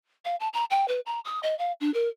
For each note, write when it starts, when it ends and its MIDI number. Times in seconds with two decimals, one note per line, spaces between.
0.25 0.36 77
0.40 0.48 81
0.53 0.64 82
0.70 0.88 79
0.88 1.00 71
1.06 1.20 82
1.25 1.40 87
1.43 1.57 75
1.59 1.72 77
1.81 1.92 62
1.94 2.08 70